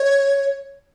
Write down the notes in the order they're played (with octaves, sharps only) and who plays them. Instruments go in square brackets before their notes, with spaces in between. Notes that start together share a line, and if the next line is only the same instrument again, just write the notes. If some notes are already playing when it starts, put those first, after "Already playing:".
Already playing: [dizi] C#5